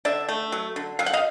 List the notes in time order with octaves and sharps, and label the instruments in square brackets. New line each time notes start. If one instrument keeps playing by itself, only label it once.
[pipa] D3 D5 E5
A3
F#3
D3
F#3 F5
F#5
D#5 F5